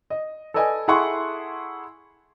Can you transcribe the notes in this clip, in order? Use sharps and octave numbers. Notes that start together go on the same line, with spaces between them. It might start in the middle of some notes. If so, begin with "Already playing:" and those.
D#5
A4 B4 D5 D#5 G#5
E4 G#4 A4 F#5 C6 C#6